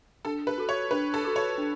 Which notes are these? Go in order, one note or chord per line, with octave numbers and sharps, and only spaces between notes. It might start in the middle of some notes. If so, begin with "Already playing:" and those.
D4 A4
B4
F#4 A4
C#5
D4 B4
A4
F#4 A4
C#5
D4